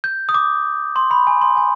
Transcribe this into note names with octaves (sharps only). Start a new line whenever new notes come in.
G6
D#6
D6
C6
B5
G#5
C6
G#5